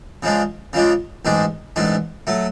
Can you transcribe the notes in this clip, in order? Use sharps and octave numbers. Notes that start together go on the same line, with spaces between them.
C#3 F3 G#3 D4
C#3 F3 G#3 D4
A1 G#2 G#3 D4
A1 G#2 G#3 D4
F#3 A3